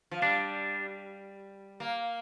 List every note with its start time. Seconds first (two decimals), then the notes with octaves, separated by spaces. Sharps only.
0.11 F3
0.22 G3 D4
1.80 A#3